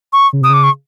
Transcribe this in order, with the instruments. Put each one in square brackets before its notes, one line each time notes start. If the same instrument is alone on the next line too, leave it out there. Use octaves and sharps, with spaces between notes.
[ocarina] C#6
[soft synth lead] C#3
[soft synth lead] C3 [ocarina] D#6
[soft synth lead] C#3 [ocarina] D6
[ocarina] C#6